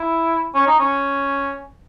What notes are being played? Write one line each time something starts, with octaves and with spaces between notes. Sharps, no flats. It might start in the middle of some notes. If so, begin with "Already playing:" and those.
Already playing: E4
C#4
D#4
C#4